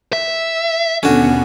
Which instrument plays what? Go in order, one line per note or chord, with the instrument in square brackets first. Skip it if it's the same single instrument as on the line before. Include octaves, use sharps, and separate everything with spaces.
[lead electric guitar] E5
[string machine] D#2 B2 B3 [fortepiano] D3 [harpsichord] C#4 F#4